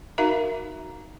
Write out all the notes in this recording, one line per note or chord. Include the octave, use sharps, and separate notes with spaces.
D#4 F#4 A#4 E5 F5 A#5